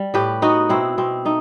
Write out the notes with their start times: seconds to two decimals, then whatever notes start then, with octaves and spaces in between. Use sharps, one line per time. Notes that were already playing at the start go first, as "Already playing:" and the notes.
Already playing: G3
0.14 A2 G4 B4
0.42 B3 D#4 F#4
0.69 B2 C4 E4
0.98 B2 C4
1.25 A3 D#4